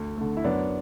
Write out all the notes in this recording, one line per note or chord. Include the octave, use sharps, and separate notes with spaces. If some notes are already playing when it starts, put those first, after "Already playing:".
Already playing: D2
D3 A3
E4
F#2 B3 D4